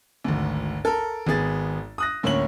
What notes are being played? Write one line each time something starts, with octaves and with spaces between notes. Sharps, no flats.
G#1 D2
A4 A#4
G#1 B3 G#4 A6
D#6 F#6 A#6
D2 A2 A#3 C#4 C#5 F#7